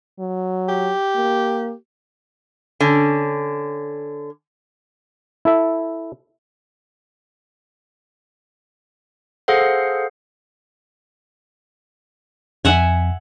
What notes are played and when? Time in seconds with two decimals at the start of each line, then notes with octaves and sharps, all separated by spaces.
0.19 F#3
0.69 G4
1.16 A#3
2.80 D3 C#4
5.45 E4 A4 E5
9.48 G#4 A4 C5 F5 F#5
12.65 F2 E5 F#5 G#5